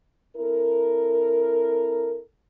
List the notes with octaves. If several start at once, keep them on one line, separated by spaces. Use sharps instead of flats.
C4 E4 A4 A#4